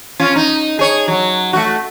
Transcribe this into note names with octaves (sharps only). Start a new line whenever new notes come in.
C#4 F4
D#4
G#4 C#5
F#3
A3 F#4